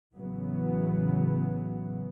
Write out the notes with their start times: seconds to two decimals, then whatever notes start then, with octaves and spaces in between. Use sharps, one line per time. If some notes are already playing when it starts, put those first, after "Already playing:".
0.16 A1 C#3 E3 F#3 B3